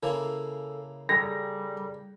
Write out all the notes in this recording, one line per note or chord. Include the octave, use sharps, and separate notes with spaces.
C#3 A#3 E4 A4
G3 G#4 A4 A#5 A#6